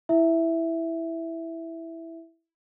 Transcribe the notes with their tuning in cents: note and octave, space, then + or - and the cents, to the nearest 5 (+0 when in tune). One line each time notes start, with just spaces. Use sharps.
E4 +0 E5 +0